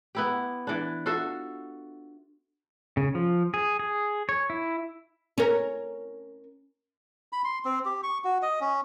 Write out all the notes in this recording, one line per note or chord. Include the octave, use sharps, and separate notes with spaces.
B3 E4 G4
E3 D4
F4 F#4 A4 E5
C#3
F3
G#4
G#4
C#5
E4
C#4 A#4
B5
C6
C4
G4
C#6
F#4
D#5
C#4